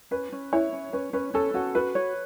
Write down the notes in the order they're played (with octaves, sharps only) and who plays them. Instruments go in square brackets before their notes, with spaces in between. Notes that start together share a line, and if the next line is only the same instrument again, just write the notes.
[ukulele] C#4 [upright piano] B4
[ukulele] C#4
[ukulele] E4 [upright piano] C#5
[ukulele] C#4
[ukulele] C#4 [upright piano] B4
[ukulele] C#4 [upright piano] B4
[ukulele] C#4 [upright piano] A4
[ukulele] C#4 [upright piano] F#4
[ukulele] F#4 [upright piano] B4
[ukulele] C#5